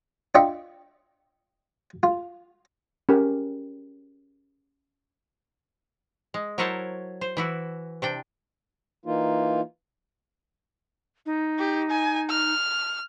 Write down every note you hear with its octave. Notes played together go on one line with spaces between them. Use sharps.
D4 F4 D#5 E5 G5 C#6
F4
C#4 G4 A#4
G#3
F#3 E4 A#4 C5 C#5 A5
C5
E3 E4 F#4
C3 D4 G5
E3 A#3 D#4 F4
D#4
G4
G#5
F6